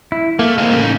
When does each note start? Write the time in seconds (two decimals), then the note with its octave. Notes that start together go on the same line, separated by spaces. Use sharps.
0.12 E4
0.39 A3 A#3
0.58 G#3 A#3 C4
0.71 A2 C#3
0.84 D#4